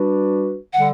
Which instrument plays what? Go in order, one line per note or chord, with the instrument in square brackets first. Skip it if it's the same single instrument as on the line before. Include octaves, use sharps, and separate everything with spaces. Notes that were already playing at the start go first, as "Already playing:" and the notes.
Already playing: [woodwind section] G3 D4 F#4 B4
[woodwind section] D3 G3 [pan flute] F#5